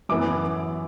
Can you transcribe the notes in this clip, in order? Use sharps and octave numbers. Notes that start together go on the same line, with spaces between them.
F#2 E3 B3 E4 D6